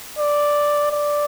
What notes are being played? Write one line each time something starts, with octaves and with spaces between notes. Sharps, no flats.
D5
D5